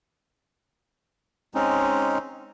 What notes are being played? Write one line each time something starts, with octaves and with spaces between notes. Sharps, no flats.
G#3 C4 C#4 D#4